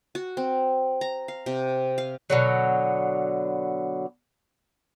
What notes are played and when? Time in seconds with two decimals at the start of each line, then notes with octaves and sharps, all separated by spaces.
0.15 F#4
0.37 C4
1.01 A#5
1.28 F5
1.46 C3
1.98 F5
2.30 B2 D3 F#3